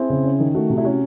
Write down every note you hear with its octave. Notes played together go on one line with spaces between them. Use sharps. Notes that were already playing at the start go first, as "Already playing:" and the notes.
Already playing: C4 E4 G#4
C#3
C#4
D#3
A3 F#4
C3
E4
C#4 F#4